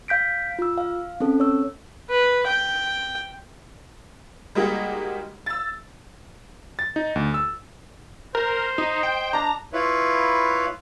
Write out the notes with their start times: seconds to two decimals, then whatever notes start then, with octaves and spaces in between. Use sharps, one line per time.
0.08 F5 G6 B6 D7
0.59 F4 E6
0.78 F5
1.20 C4 C#4 A4
1.40 C#5 E6
2.10 B4
2.47 G5
4.55 G3 G#3 A#3 D#4 F#4 G4
5.46 E6 A6
6.79 A6
6.96 D#4
7.16 D2
7.34 E6
8.35 A#4 C5
8.78 D#4 D#5
9.03 G5
9.33 D4 A5 A#5
9.73 E4 F4 B4 C#5